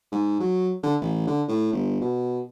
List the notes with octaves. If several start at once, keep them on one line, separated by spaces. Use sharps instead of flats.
G#2
F#3
D3
A1
D3
A2
G1
B2